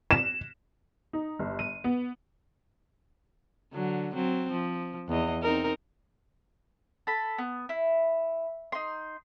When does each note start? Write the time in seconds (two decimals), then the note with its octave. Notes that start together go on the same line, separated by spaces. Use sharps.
0.11 E7
1.13 D#4
1.39 G1
1.59 D#7
1.84 B3
3.74 D3 F#3
4.14 F#3 C4
4.51 F3
5.09 E2 D#5
5.43 C4 D#4 A#4
7.07 A4 B5
7.38 B3
7.69 E4
8.72 D#4 C6